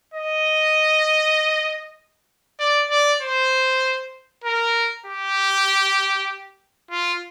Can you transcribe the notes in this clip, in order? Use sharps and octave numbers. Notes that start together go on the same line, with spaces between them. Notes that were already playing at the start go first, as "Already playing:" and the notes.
D#5
D5
D5
C5
A#4
G4
F4